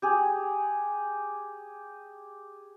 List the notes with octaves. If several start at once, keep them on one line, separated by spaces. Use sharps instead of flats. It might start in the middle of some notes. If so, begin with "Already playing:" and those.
G4 G#4